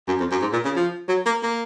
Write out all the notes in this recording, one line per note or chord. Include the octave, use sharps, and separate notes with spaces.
F#2
F2
F#2
G#2
A#2
C#3
F3
F#3
A#3
A#3